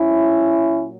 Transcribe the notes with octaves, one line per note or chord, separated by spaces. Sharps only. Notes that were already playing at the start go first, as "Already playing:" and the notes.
Already playing: G#2 F#3 C#4 E4
A#2 F#3